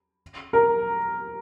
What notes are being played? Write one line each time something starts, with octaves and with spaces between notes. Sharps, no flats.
A#4